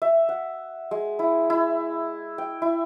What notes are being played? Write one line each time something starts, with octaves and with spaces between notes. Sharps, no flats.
E5
F#5
G#3
E4
E4
G5
E4